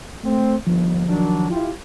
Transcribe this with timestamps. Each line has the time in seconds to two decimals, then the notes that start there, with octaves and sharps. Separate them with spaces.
0.24 A3 C4
0.67 G1 D#2 F3
1.08 D#3 F#3 D4
1.50 E4 F4 G4